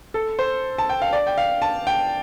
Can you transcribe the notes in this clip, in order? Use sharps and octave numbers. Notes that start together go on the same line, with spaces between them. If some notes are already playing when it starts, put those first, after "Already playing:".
A4
C5
A5
G5
F5
D5
G5
F5
A5
G5